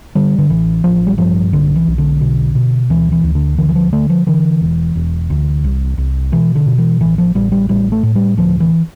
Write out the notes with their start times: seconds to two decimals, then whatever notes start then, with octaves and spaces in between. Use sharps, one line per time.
0.15 D3 G3
0.38 D3
0.50 A1 E3
0.84 A1 F3
1.07 G3
1.18 G2 F3
1.52 B1 D3
1.76 E3
1.87 B1
1.98 D3
2.21 B2
2.55 B2
2.90 D2 E3
3.12 E3
3.24 D2
3.35 D3
3.58 D3 E3
3.69 E3
3.75 F3
3.93 D3 A3
4.10 F3
4.27 D3 E3
4.61 E1
4.95 E1
5.30 D2
5.64 C2
5.98 C2
6.32 B2 E3
6.55 D3
6.66 B2
6.78 E3
7.00 A1 E3
7.18 F3
7.35 A1 G3
7.52 G3
7.69 A2 G3
7.92 A3
8.03 A2
8.15 G3
8.37 D2 F3
8.60 E3